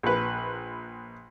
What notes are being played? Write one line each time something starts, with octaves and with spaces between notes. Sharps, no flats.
A#1 B4